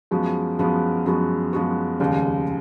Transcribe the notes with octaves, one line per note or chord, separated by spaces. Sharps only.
F#2 F3 G#3 B3 F#4
F#2 F3 G#3 B3 F#4
F#2 F3 G#3 B3 F#4
F#2 F3 G#3 B3 F#4
F1 D#2 C#3 G#3